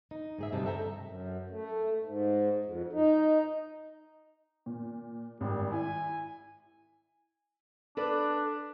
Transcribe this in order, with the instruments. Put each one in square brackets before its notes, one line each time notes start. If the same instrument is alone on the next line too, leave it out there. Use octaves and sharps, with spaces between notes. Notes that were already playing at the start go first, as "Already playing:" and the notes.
[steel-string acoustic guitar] D#4
G#2 G#4 E5
D2 G2 C3 D#4 A5
A4 E5 G5 A#5
[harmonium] F#2
A3
G#2
F2
D#4
[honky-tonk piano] A#2
[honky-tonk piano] G#1 [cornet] G3
[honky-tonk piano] E4 [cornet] G#5
[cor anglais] D4 [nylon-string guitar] A4 B4 D5